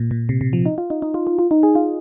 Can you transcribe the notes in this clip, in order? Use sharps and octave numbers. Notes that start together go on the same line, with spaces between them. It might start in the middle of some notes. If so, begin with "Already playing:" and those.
Already playing: A#2
A#2
C3
C3
F3
D#4
F4
D#4
D#4
F4
F4
F4
D#4
G#4
F4